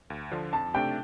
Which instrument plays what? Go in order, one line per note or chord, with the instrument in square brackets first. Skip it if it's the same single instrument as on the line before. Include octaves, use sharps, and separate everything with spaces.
[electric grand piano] D2
D3 F3 D4 F4
[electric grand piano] F2 [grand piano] A5
[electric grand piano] C3 A3 D4 G4 [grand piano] G5